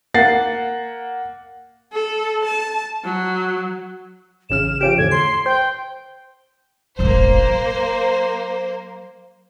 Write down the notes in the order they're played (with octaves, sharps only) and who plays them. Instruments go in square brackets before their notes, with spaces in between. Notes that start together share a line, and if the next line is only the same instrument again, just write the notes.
[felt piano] A#3 F#5 A6 C7
[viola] A4
A5
F#3
[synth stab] A1 C#3 F6 [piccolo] E7
[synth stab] F3 C#4 G4 [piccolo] D7
[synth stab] E2 A2 D3 [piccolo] G#6
[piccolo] C6 [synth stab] C7
[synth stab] C5 [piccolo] G5
[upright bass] E1 A1 [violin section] A#3 C5
[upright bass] F#3